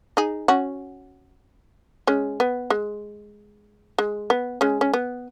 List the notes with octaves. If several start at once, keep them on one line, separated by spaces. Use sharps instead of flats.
D#4 G#4
C#4 F#4
G#3 C#4
B3
G#3
G#3
B3
G#3 C#4
C#4
B3